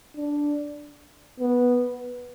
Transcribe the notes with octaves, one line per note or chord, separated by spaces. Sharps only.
D4
B3